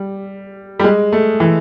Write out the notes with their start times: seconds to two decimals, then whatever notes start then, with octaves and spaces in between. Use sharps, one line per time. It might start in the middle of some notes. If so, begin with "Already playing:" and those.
Already playing: G3
0.79 G3
0.84 G#3
1.12 A3
1.40 E3